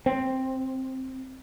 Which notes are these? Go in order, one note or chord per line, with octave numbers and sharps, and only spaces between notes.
C4